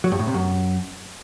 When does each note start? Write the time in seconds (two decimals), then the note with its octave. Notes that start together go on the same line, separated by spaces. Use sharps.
0.04 F#3
0.12 G2
0.19 A2
0.27 C3
0.34 F#2